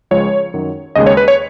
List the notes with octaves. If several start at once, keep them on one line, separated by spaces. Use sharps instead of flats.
C#2 C#3 F3 G#3 C#5
F#2 D#3 F#3
D#2 C#3 G#3 D#5
C#5
B4
C#5